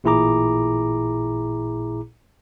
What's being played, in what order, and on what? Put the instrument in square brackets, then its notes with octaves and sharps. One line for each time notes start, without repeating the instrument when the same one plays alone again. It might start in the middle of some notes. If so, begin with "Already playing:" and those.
[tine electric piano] A1 A#2 E4 G#4 A#5 D6